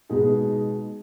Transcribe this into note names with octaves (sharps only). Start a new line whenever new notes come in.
B2 G#3 D#4 G#4